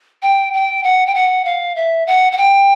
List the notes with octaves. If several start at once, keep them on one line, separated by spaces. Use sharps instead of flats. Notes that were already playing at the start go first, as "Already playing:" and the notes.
G5
G5
F#5
G5
F#5
F5
E5
F#5
F#5
G5